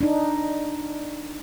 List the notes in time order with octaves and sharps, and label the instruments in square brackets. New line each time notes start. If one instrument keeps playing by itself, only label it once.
[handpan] D4 D#4